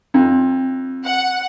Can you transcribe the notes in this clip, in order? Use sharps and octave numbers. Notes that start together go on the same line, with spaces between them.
F2
F#5